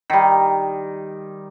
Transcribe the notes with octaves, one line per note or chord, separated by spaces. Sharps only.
D#3 G3